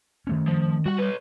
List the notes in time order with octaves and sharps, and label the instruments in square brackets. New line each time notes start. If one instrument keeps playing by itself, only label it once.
[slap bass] D#3 A3 C#4
[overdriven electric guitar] F3
[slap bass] G3 [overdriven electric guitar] F#4 F#5
[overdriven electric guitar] B4 C#5